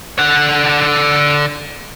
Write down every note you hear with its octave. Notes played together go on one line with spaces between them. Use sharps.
D3 F#5